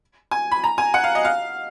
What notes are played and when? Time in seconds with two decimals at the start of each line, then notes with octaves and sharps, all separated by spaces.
0.31 G#5
0.51 B5
0.64 A#5
0.78 G#5
0.94 F#5
1.04 F5
1.15 D#5
1.25 F5